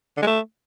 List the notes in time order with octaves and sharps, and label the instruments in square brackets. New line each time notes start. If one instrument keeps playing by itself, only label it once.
[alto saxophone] D3
G#3
A3